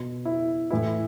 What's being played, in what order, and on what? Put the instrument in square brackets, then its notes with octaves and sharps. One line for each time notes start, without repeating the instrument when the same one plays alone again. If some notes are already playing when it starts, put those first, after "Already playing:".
Already playing: [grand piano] B2
E4
A2 E3 E4